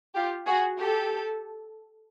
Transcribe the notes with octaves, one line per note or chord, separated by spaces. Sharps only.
F4 G4
F#4 G#4
G4 A4